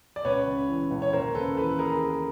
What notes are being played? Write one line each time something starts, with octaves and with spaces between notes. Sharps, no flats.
D5
C#2 B4 C#5
C#3
E3
C#2
C#5
D#2 A#4 C5
C#3 A4 B4
E3 A4 B4
G#4 A#4